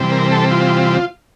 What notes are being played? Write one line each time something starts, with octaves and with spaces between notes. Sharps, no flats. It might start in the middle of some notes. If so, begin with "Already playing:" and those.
Already playing: C3 E3 G3 C4
A#4
A4
F4